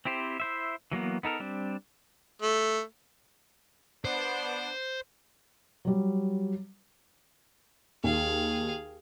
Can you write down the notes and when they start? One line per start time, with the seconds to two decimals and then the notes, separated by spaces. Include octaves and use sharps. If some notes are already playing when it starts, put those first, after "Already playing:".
0.05 C4 E4 G4 C5
0.40 E4 C5 E5
0.92 E3 F#3 A#3 B3
1.23 B3 D#4 A4 A#4
1.40 G3 C4 D4
2.42 A3
4.05 B3 D4 C5
5.85 F#3 G3
8.04 D#2 G#4 F5